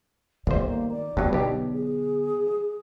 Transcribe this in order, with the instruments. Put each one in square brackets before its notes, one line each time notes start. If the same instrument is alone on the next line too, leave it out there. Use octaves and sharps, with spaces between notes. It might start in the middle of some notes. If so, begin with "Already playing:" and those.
[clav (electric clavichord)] G1 C5 [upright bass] D#3 [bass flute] D5
[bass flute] A#3
D5
[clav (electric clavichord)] G2 F#3 [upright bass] D3 B3
[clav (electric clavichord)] B1 G4
[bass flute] G#4